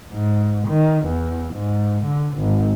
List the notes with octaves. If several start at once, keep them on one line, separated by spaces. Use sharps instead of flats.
G#2
D#3
E2
G#2
D3
G#1